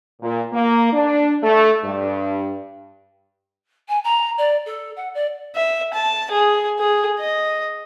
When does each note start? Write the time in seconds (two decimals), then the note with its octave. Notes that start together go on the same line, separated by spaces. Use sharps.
0.22 A#2
0.53 A#3
0.93 D4
1.43 A3
1.83 G2
3.88 G#5
4.04 A#5
4.38 D5
4.66 A4
4.96 F#5
5.14 D5
5.56 E5
5.94 A5
6.31 G#4
6.80 G#4
7.19 D#5